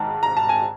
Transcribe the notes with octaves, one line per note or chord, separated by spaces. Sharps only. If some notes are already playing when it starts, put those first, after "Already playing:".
Already playing: G#2 D#3 A5 A#5
A#5
A5
G#5